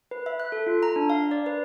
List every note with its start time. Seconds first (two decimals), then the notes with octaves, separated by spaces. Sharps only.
0.11 B4
0.26 E5
0.40 F#6
0.52 A4
0.67 F4
0.83 A#5
0.96 D4
1.10 F5
1.31 D5
1.46 B4